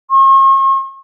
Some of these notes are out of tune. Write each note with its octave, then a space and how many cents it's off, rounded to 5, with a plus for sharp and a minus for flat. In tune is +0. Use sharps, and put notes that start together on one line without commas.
C#6 -45